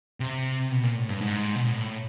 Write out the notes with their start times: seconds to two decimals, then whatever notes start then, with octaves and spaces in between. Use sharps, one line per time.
0.20 C3
0.71 B2
0.83 A#2
0.96 A2
1.09 G2
1.21 G#2
1.55 B2
1.63 A#2
1.72 A2